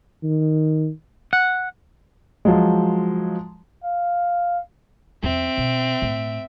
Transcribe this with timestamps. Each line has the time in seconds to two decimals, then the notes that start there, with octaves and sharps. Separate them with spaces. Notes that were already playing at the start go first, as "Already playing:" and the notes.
0.23 D#3
1.33 F#5
2.45 F3 F#3 G#3
3.84 F5
5.23 E2 F3 C4 E5 D7
5.57 B2
6.02 A2